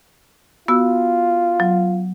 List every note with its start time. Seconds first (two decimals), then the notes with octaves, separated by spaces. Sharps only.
0.68 B3 F4 F#4 E6
1.60 F#3